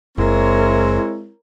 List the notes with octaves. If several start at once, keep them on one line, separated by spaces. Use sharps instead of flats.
F#1 G#3 C4 E4 A#4 C#5